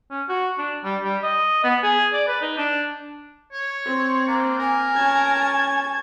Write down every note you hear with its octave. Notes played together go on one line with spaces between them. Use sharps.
C#4
F#4
D4
G3
G3
D#5
B3
G#4
D5
B4
D#4
D4
C#5
C4 C6
A#3 D4 C5
A#4 G#5
C#4 A5 G#6